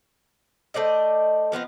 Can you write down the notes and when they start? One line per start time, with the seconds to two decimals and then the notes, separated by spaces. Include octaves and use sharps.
0.74 A3 C5 D5 D#5
1.52 F3 B3 C4 D#4